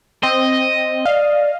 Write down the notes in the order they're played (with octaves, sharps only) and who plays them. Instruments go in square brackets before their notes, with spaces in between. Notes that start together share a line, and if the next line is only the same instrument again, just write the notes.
[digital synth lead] C4 [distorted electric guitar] D#5
[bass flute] D5 [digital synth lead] F5